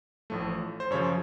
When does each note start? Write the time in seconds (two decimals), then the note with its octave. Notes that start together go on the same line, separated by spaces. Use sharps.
0.30 A1 A2 F3 A3
0.80 C5
0.91 F#2 C#3 F3 C#5